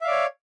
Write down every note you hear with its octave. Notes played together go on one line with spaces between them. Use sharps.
C#5 D5 E5 F5